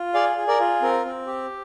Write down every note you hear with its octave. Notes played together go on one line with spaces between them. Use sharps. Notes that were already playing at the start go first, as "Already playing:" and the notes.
Already playing: F4
G#4 D5 F5
G#4
A#4 D5
F4
C4 A#4
C4
G4